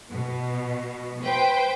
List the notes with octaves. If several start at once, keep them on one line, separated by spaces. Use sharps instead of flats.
B2
B4 C5 G5